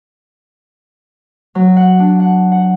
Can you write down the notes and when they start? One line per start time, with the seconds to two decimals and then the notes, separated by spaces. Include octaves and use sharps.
1.55 F#3
1.77 F#5
1.99 D4
2.20 F#5
2.52 F#5